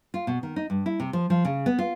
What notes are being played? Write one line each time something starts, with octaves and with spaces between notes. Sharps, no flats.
F4
B2
D#3
D#4
G2
E4
C3
F3
F3
C#3
B3
F4